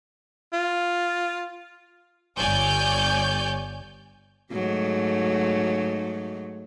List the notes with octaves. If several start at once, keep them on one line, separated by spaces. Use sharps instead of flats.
F4
G1 C#5 D5 G#5 G6
G#2 F#3 A3